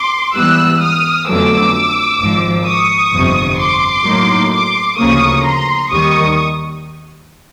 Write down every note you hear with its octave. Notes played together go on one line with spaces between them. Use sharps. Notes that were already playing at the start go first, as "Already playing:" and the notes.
Already playing: C6 D6
G#2 E3 G3 B3 E6 F#6
D#6 F6
G1 F2 D3 F#3 A3 D6 E6
G#1 G#2 F3
C#6 D#6
G1 F2 C3
C6 D6
A2 F#3 A#3 D#4
C6 D6
D2 C#3 F3 A#3 C#6 D#6
A#5 C6
D#2 D#3 G3 C#6 D#6